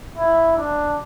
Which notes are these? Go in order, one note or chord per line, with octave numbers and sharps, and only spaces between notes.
E4
D4